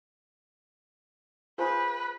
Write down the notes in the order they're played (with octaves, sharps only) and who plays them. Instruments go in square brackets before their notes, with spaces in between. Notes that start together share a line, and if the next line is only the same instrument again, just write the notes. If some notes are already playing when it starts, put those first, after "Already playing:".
[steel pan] F4 G#4 C5 [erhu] B4